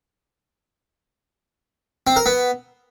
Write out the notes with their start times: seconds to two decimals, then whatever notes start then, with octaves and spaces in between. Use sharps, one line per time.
2.07 C4
2.16 A#4
2.26 B3